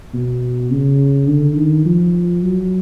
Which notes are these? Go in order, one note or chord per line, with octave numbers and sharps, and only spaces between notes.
B2
C#3
D3
D#3
F3
F#3